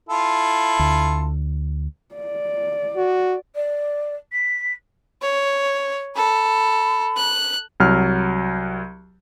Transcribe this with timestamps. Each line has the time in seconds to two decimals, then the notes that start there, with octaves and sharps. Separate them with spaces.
0.09 E4 F4 A4
0.79 D2
2.15 D5
2.96 F#4
3.55 D5
4.32 B6
5.22 C#5
6.16 A4 B5
7.16 F#6
7.80 C2 F#3 F6